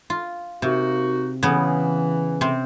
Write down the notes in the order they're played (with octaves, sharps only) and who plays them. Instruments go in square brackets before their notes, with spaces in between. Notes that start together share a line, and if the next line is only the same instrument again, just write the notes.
[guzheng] F4
[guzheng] C3 [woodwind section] A#3 D#4 F#4
[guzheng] C#3 B3 [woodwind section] E3
[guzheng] C3 C4 C6